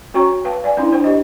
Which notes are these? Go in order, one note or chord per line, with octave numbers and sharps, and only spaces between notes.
C#4 F#4 C#5 G5 A#5 C#6
B4 F5 G5 A5
D5 F5 G#5
C#4 D4 E4 C6
D4 C5 G5
G4 D#5